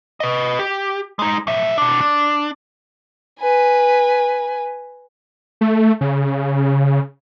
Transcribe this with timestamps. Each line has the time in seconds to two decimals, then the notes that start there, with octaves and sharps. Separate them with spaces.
0.20 B4 D#5
0.59 G4
1.19 G#3 D#4
1.47 B1 E5
1.78 B2 D4
2.01 D4
3.40 B4 G#5
5.61 A3
6.01 C#3